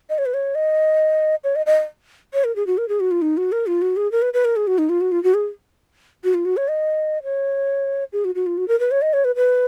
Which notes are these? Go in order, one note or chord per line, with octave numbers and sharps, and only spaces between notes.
D#5
C#5
B4
C#5
D#5
C#5
D#5
D#5
C#5
A#4
G#4
F#4
A#4
G#4
F#4
F4
D#4
F#4
A#4
F4
F#4
G#4
A#4
B4
B4
A#4
G#4
F#4
D#4
F4
F#4
F4
F#4
G#4
F#4
F4
F#4
C#5
D#5
C#5
G#4
F#4
F#4
F4
F#4
A#4
B4
C#5
D#5
C#5
B4
B4